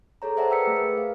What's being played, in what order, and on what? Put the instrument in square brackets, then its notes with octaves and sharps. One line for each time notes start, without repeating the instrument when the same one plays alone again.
[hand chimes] G#4 A4 C#5 A#5
C5 D5 E5 F#5 A5 A#5
B4 G5 E6 B6 C#7
A3 G#4 A#4
B4
F5